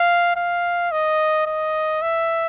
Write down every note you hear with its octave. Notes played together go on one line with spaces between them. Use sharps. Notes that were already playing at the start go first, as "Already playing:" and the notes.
Already playing: F5
F5
D#5
D#5
E5